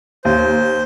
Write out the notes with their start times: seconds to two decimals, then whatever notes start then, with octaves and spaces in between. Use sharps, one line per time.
0.25 D#2 C5